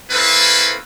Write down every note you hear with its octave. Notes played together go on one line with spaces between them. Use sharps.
A#3 C4 C#4 E4 A4 B4